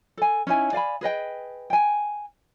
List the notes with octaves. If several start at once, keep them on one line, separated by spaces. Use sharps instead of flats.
A4 G#5
C#4 D#4 E4 G#5
D5 F5 G#5 B5
G#4 B4 D#5 G5
G5 G#5